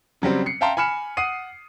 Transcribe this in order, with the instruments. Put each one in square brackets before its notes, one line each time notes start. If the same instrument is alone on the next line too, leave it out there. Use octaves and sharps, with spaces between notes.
[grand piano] C#3 F#3 G3 C4
C7 C#7
E5 F5 G5 A5 A#5 C6
G#5 B5 F6 C#7 E7
F#5 D#6 C7 D#7